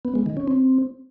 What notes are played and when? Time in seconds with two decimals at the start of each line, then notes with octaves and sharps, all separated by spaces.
0.05 B3
0.15 G#3
0.26 D#3
0.37 C#4
0.48 C4